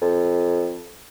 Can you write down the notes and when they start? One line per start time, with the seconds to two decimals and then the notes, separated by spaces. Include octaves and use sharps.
0.01 F2